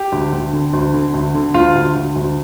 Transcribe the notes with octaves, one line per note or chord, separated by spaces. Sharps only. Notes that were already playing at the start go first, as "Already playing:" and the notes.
Already playing: G4
D2
D2
D3
D2
D3
D2
D3
D2 F4
D2
D2
D2